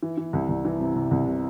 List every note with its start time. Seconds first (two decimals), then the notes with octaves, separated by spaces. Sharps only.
0.03 E3
0.18 E3
0.33 C2
0.49 C2
0.65 E3
0.80 C3
0.96 C3
1.11 C2
1.27 C3